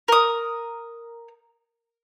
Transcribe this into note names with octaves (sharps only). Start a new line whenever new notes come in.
A#4 D#6